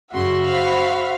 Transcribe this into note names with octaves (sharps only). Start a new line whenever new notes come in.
F#2 C#3 F#4 E5 C6
C5 F5 B5